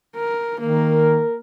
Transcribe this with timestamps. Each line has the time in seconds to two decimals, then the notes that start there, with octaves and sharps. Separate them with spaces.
0.16 A#4
0.60 D#3 A#3 A#4